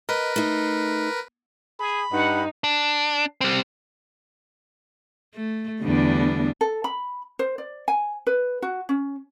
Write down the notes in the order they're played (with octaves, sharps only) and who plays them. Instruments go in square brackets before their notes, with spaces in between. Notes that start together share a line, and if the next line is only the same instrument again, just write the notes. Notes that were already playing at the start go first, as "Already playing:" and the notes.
[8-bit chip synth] A#4 B4 [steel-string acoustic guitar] D#5
[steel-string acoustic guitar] A3 D#4
[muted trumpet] G#4 [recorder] B5
[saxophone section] G2 [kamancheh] D#4 [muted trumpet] F#5
[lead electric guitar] D4
G3 C4
[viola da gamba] A3
[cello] E2 D3 [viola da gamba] G3 B3 D4
[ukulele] A4
B5
C5
D5
G#5
B4
F#4
C#4